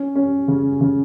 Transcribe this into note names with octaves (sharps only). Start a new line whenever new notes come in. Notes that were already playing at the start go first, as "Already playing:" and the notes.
Already playing: C#4
C#4
C#3
C#3